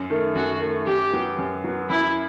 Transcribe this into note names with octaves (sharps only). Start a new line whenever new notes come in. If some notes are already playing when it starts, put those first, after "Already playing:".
Already playing: F#2
D#3 A3
F#2 F#4
D#3 A3
F#2 G4
F#3 B3
F#2
F#3 B3
F#2 E4